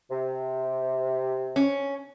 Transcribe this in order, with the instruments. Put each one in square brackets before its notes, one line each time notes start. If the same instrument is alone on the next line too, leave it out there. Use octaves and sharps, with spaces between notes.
[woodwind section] C3
[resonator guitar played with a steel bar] C#4